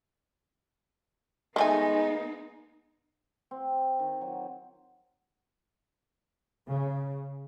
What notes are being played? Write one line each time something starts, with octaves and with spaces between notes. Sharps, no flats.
D#3 G#3 A3 B3 D#4 G#5
C4
D#3
F#3
C#3